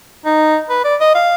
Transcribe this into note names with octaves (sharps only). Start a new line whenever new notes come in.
D#4
B4
D5
D#5
F5